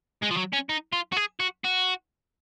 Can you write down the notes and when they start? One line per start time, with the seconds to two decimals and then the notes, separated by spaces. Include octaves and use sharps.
0.22 G#3
0.30 F3
0.37 F#3
0.53 C#4
0.69 D#4
0.92 F4
1.12 F#4
1.17 G#4
1.40 F#4
1.65 F#4